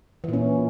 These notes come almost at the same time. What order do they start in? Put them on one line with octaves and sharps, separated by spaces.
E3 A#2 C#4